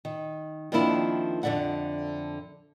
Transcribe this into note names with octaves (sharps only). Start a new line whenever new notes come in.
D#3
D#3 F3 A#3 C4 D4 E4
F2 D3 D5 E5 F#5